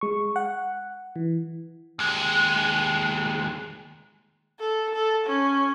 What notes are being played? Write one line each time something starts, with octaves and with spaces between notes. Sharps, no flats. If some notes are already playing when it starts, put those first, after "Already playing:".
G#3 C#6
F#5
E3
D#2 G#3
A4
A4
C#4